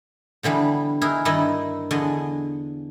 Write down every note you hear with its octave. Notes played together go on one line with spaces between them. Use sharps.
B2 D3 E3 G3
D#4 E4 G#4 A#4
G2 D#3 D#4 E4 D5 D#5
E2 D3 D#5 G#5